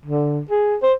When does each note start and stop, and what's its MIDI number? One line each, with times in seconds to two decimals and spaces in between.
0.05 0.41 50
0.50 0.76 68
0.82 0.94 72